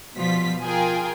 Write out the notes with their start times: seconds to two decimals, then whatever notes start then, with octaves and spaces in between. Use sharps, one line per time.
0.15 B2 F3 G3 F4 B6
0.62 F4 G#4 A#4 G5 G#5